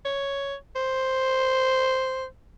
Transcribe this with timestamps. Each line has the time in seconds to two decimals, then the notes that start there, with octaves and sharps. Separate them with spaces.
0.05 C#5
0.76 C5